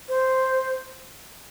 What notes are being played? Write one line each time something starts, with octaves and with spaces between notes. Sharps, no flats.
C5